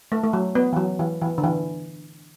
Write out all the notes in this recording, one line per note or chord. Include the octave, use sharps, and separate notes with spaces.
A3
A3
F#3
B3
E3
F#3
E3
E3
D3
E3